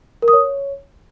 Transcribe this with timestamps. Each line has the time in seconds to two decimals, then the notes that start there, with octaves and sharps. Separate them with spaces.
0.22 A#4
0.28 D#6
0.33 C#5